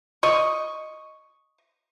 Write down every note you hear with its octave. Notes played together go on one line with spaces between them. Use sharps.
D#5 C#6